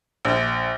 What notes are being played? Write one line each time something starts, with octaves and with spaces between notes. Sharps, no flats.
A#1